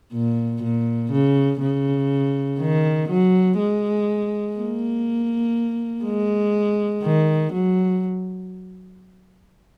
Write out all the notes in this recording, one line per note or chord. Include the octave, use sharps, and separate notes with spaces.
A#2
A#2
C#3
C#3
D#3
F#3
G#3
A#3
G#3
D#3
F#3